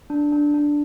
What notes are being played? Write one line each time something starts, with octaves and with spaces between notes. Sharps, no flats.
D4
D4
D4